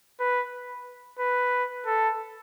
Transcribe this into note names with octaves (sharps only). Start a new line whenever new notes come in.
B4
B4
A4